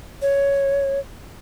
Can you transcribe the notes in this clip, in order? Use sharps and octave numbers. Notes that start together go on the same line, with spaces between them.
C#5